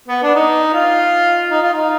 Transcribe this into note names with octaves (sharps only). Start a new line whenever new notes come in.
B3
D4
D#4
F4
D#4
F4
D#4